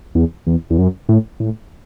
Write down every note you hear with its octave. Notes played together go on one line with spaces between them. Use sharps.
E2
E2
E2
F#2
A2
A2